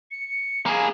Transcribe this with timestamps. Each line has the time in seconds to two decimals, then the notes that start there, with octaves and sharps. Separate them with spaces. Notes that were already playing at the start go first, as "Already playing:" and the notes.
0.11 C#7
0.66 A#3 G#4 G#5